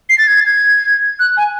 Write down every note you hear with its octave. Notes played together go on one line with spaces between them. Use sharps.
C7
A6
G#6
A6
G#6
F#6
G#5